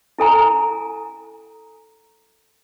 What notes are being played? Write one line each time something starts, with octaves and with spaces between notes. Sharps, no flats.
E4 A4 G#5 A#5